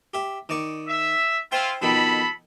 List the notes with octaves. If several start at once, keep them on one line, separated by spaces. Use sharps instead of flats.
G4 E5
D#3 D5 C#6
E5
E4 F4 C5 E5 G5
F2 B2 D#3 A4 B5